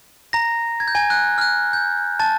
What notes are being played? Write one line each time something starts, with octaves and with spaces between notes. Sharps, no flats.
A#5 A#6
G#6
G6
G#5 G#6
F#6
F6
F#6
G6
A5 A6